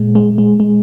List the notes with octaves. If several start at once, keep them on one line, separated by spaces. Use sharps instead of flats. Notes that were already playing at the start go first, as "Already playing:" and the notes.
Already playing: A#2 G#3
G#3
G#3
G#3